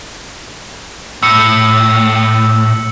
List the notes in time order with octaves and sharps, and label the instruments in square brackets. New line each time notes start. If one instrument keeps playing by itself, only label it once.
[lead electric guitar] A2 [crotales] E6 C#7